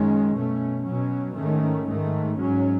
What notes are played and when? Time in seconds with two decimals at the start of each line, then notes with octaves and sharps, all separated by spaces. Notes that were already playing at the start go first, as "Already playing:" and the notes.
Already playing: F#2 D#3 G#3 C#4
0.34 B2 A3 C#4
0.85 B2 F#3 C#4
1.36 G#2 D#3 A3 C#4
1.87 G#2 D#3 A3
2.38 G#2 F#3 C#4